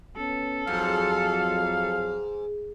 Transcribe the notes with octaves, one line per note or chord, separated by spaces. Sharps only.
B3 C#4 A4
F2 G#2 F#3 F5